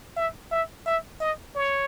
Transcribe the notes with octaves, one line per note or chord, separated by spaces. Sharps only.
E5
E5
E5
D#5
C#5